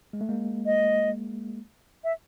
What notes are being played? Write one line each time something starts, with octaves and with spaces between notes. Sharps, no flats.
G#3
A3
G#3 A#3
D#5
E5